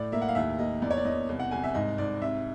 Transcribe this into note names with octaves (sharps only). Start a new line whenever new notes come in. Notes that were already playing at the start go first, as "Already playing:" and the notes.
Already playing: A2 D5
A#3 E5
F#5
F5
D#2 E5
A#3 D#5
E2 D5
C#5
D5
E2 D#5
C2
F#5
C2 G#5
E5
G#2 D#5
G#2 D5
C3 E5